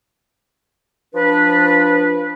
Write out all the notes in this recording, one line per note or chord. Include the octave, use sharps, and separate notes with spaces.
F3 D4 B4